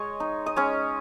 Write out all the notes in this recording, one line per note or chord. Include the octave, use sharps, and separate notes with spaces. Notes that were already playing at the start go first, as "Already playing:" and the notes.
Already playing: G#3 C#5 D#5
D#4
D#5
G#3 C#4 C#5